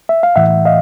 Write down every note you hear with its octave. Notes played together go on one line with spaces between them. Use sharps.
E5
F5
A2 E3 A3 E5 F#5
D#5 F5